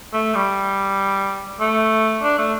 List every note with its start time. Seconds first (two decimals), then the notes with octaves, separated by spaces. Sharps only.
0.13 A3
0.35 G3
1.60 A3
2.22 D4
2.38 A3